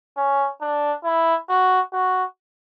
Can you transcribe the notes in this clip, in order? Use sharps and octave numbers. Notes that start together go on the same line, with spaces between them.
C#4
D4
E4
F#4
F#4